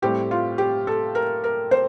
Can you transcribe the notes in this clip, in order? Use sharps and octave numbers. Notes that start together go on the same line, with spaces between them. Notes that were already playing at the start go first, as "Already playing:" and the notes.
A2 G3 C4 G4
F4
G4
A4
A#4
A#4
C5